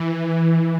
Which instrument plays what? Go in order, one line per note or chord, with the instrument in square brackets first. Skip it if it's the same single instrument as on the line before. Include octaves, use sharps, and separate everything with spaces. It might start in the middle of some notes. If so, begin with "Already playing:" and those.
Already playing: [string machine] E3